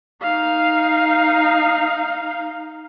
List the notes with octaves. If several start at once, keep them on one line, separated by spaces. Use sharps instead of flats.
D#4 F5